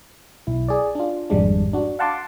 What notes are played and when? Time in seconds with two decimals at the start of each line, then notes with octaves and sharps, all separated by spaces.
0.47 B1 E4
0.68 G#4 D5
0.95 D4 F4
1.30 G#1 F2 G3 G#3 D4
1.73 D4 F#4
1.99 F5 F#5 A5 C6 D6